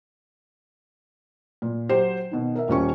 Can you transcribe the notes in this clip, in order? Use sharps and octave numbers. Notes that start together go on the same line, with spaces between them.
A#2
F#3 G4 C5
B2 D#3
A#4 E5
D#1 G3 C#4 C#6